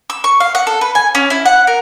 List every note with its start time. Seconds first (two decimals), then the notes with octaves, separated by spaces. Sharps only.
0.10 E6
0.24 C#6
0.40 F5
0.55 F#5
0.67 A4
0.81 B4
0.95 G#5
1.15 C#4
1.30 E4
1.46 F#5
1.67 A#4